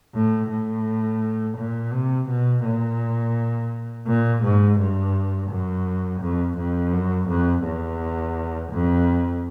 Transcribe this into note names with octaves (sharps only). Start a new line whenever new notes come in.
A2
A2
A#2
C3
B2
A#2
A#2
G#2
G2
F#2
F2
F2
F#2
F2
E2
F2